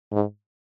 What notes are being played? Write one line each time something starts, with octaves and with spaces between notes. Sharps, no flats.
G#2